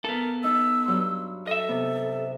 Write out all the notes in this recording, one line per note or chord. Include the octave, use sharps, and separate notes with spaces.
B3 A4 A#4
D#4 D#5 E6
G2 F#3 C6
A4 D#5 E5
C3 B3